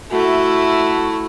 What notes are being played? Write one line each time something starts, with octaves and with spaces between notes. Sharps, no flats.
A3 E4 F#4